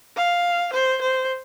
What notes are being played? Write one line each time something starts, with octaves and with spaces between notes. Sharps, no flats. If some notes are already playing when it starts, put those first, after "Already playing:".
F5
C5
C5